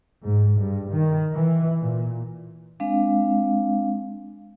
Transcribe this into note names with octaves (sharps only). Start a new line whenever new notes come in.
G#2
G2
D#3
E3
A#2
G#3 C4 D4 F5